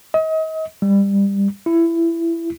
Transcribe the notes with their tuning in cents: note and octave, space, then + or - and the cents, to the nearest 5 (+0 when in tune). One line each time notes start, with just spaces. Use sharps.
D#5 +35
G3 +25
E4 +20